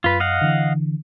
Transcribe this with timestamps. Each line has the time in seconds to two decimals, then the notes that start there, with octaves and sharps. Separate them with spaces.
0.04 F#2 F4 B4
0.20 D#5 F5 F#5
0.42 D3 E3